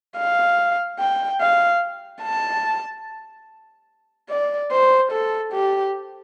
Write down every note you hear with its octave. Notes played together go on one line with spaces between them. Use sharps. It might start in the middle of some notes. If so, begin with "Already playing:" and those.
F5
G5
F5
A5
D5
C5
A4
G4